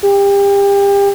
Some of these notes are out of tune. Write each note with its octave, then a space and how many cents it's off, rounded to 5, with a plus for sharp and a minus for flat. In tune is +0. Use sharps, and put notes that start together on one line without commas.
G4 +30